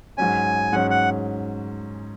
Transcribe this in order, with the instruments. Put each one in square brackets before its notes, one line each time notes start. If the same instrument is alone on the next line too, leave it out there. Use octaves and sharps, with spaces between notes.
[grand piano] G#2 F#3 C#4 [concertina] G#5
[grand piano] G#2 F#3 C#4 [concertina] F#5
[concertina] F#5